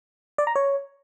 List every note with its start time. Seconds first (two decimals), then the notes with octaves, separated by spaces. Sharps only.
0.38 D5
0.47 A#5
0.56 C#5